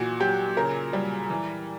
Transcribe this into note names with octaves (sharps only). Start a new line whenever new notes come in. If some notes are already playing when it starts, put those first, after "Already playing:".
Already playing: A#2 E3 F#4
F#3 G4
C#3 A#4
G3
E3